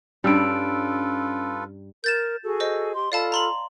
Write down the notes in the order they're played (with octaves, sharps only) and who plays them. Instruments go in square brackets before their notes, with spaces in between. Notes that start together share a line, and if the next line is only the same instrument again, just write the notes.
[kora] G2 G3 [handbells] C#4 E6 D7 [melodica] F4 A4 B4
[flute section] A#4 [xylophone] G6 A6 E7
[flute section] F#4 G#4 A4
[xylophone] C5 D#5
[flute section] G4 C6
[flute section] F4 A4 B5 [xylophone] D5 F5 A5
[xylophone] A#5 C6 F#7